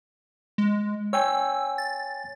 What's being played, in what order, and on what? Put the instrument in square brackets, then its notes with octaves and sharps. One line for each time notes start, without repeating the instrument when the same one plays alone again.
[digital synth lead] G#3
[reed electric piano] C#5 G5 G#5 [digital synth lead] E6
[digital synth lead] A6